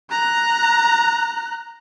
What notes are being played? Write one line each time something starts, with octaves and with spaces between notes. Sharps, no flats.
A#5 F#6